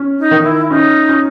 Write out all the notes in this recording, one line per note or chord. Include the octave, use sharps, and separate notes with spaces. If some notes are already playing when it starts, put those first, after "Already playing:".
Already playing: C#4
D#4
D#3
E4
C#4 D#4
C#4